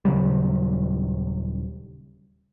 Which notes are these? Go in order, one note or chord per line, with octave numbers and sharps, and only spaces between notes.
D#1 C#3 F#3 G3